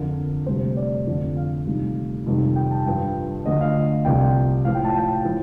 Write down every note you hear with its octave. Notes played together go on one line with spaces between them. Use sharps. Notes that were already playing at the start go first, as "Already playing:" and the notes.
Already playing: F2 D3 F3 A#4
D2 C3 G3 C5
D5
F2 D3 F3
F5
D2 C3 D#3 G3
F2 C3 D#3 G3
G5
A5
G2 F3 G5
D2 D3 F3 D#5
F5
C2 C3 F3 G5
A2 F3 F5
G5
A5
G5
A2 F3